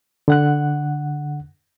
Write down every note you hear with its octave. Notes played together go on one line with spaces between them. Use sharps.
D3 F#5 F#6